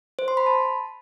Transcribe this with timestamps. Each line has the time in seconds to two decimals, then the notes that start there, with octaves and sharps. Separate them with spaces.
0.19 C5
0.28 C6
0.37 B5
0.46 A5